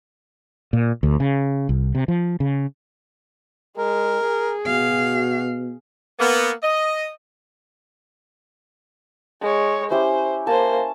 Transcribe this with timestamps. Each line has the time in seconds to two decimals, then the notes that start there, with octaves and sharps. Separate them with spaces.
0.73 A#2
1.03 D2
1.20 C#3
1.69 C2
1.95 C3
2.08 F3
2.40 C#3
3.78 G#3 A#4
4.27 G#4
4.67 B2 F#4 F5
6.19 A#3 B3
6.63 D#5
9.42 G#3 C#5
9.91 C#4 E4 G4 C5
10.47 A#3 C5 G#5 A5